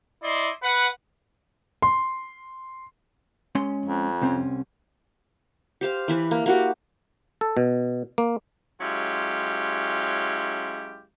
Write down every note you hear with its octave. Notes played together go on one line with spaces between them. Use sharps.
E4 D5 D#5 C6
B4 F#5
C6
G#3 C#4 C6
F2
C2 C4 C#4
G4 C5 F5
E3 E4 B4
A#3
A#3 F#4 G4
A4
B2
A#3
F#3 G#3 C#4 E4 F4 G4